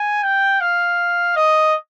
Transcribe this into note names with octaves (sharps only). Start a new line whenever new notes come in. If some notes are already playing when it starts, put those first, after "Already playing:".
Already playing: G#5
G5
F5
D#5